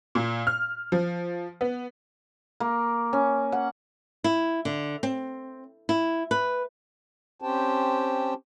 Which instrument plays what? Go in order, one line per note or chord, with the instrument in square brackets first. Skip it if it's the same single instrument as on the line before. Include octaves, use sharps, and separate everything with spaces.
[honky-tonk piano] A#2
F6
F3
B3
[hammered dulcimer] A#3
C#4
F#5
[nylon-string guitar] E4
D3
C4
E4
B4
[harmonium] C4 C#4 G4 C5 G5 A5